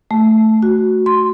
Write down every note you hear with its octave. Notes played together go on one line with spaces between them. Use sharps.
A3
F#4
C6